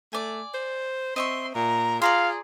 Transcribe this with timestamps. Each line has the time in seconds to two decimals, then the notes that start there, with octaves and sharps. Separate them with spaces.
0.13 A3 D5 G#5
0.54 C5
1.16 C4 D#5 E5 C6 C#6
1.55 A#2 A#5
2.02 F4 G#4 D5 F5 A#5 C6